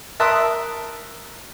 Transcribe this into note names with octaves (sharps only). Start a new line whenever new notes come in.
A#4 E5 A5 C6 D#6 F#6